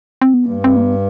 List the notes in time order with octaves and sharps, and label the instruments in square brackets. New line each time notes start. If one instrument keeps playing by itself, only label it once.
[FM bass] C4
B3
[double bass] G2 [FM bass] A#3
[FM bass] C4
A#3
B3